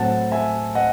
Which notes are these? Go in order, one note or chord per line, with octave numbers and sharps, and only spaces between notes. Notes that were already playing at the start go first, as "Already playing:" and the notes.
Already playing: A2 F#3 C4 F#5 A5
E5 G#5
D#5 F#5